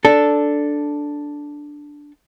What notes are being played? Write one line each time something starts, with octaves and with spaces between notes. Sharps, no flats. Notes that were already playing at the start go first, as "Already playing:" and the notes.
D4 A4